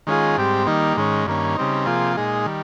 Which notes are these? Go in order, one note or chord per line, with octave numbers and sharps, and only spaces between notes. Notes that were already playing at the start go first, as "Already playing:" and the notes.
D#3 G#3 C#4 F4 G#4
G#2 G3 C4 G4
D#3 G3 A#3 D#4
G#2 D#3 G#3 C#4
G2 D#3 A#3 C#4
C#3 G3 C4 D#4
C3 F3 A#3 F4 G#4
A#2 G#3 D#4 G#4
D#3 G3